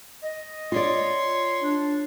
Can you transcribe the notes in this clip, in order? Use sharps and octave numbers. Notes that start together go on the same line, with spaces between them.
D#5
F4 C#5 D5 C6
D4